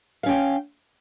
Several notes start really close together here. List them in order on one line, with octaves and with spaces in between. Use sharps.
F5 C#4 G5